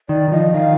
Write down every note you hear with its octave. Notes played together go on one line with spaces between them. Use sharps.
D#3 D5
D#3
F3 D#5
D#3 F5